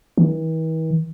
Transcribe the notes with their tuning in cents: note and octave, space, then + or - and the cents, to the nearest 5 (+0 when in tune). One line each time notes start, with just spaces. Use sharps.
E3 -45